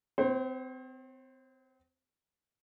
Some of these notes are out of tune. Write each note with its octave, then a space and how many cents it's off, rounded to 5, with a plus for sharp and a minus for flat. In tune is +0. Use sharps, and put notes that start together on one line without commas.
C4 -30 C5 +35